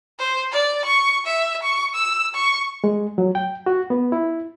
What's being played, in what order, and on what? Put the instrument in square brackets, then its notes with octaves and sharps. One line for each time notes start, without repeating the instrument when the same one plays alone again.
[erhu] C5
D5
C#6
E5
C#6
E6
C#6
[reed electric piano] G#3
F#3
G5
F#4
B3
E4